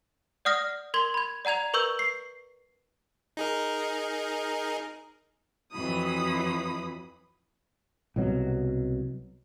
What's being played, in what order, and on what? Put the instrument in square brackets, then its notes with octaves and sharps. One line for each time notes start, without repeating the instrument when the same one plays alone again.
[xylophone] D5 F#5 D#6 F6 A#6
A#4 C6 G#6 G7
B5 G#6
D5 F#5 A#5 G#6 F7
A#4 B4 C#6 E6 G6 G7
C7
[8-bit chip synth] D#4 G#4 A#4
[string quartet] F2 E3 F#3 B5 D#6
[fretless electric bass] C2 B2 F#3